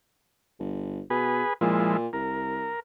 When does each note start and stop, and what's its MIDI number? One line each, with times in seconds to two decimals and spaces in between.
0.59 1.01 31
1.10 1.43 47
1.10 1.53 68
1.10 1.53 71
1.61 2.07 46
1.61 1.97 53
1.61 1.97 56
1.61 1.97 64
2.13 2.71 36
2.13 2.80 70